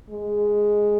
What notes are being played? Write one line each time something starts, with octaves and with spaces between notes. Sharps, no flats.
G#3